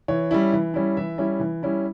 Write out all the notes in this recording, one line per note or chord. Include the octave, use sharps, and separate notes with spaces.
E3 C#5
G3 C#4 E4
E3
G3 C#4 E4
E3 E5
G3 C#4 E4
E3
G3 C#4 E4